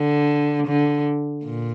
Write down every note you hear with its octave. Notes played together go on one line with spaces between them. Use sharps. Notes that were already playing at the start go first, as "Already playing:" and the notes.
Already playing: D3
D3
A#2